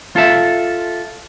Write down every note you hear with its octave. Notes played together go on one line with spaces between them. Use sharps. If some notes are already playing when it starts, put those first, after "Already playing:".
F4 A4 E5